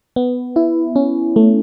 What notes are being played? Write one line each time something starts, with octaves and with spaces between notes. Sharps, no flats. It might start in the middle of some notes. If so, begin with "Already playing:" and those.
B3
E4
C#4
A3